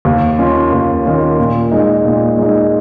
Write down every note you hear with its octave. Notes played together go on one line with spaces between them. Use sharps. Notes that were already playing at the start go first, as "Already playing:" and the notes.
D#2
D#3 A#3 C#4 F4
D#2
D#3 A#3 C#4 F4
A#2
G#3 D#4
A#2
G#3 D#4